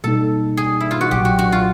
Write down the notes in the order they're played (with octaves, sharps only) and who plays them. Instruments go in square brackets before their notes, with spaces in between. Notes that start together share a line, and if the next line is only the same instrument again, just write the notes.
[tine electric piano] B2 G3 A#3 D#4 [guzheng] A4
[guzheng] G#4
E4
F4
F#4
[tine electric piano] B1 A#2 F#3 [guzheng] G4
[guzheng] F#4
F#4
F4